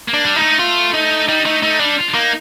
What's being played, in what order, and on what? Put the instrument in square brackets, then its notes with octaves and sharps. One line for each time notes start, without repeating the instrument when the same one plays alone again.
[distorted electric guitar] A#3
[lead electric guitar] D4
[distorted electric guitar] G3
[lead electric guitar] D#4
[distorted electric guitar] A3
[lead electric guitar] F4
D#4
[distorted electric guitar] G3 [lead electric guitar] D#4
[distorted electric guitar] A3 [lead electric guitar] D#4
[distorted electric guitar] A3 [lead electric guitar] D#4
[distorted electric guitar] G3 [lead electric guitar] D4
[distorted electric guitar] F4
D4
[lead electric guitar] A#3 [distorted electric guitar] D#4